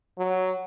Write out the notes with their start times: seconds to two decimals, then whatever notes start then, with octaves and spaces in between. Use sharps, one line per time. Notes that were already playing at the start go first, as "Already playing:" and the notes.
0.18 F#3